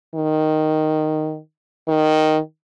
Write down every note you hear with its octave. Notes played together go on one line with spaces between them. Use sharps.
D#3
D#3